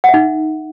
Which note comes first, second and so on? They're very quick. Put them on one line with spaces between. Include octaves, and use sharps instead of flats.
F#5 E5 D#4